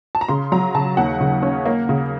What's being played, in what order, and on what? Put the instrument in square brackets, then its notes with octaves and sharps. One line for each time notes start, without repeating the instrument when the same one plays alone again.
[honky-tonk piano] A5
A#5
C#3 C6
F#3 A#5
C#3 A5
D#2 F#5
C#3
C#4
A#3
C#3